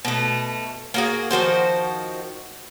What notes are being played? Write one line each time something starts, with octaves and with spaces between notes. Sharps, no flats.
B2 A3
A#3 F#4 G#4
D#3 F3 F#4 C5